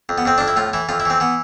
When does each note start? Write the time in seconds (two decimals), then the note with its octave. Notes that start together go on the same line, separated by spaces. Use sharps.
0.09 F2
0.18 B3
0.25 F2 C4
0.38 F2 D4
0.48 E4
0.56 A2 F4
0.73 E3 E4
0.89 F2 F4
1.00 E4
1.05 E3 C4
1.20 E3 B3